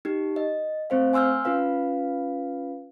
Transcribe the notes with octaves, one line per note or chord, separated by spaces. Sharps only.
D#4 G4
D#5
A3 C4 C5 F5
G#5 C6 E6 F6 G6
C#4 F4 B4 F5